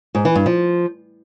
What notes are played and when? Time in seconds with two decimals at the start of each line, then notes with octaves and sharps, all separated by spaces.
0.15 G#2
0.25 E3
0.35 G2
0.46 F3